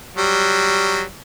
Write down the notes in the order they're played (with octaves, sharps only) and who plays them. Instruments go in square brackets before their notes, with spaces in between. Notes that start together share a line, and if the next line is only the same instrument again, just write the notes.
[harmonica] F#3 G3